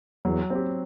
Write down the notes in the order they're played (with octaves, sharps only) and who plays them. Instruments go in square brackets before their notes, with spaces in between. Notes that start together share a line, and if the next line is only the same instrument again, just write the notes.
[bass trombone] E2 [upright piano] F#3
[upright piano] C4 G4